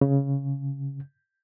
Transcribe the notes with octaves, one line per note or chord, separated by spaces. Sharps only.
C#3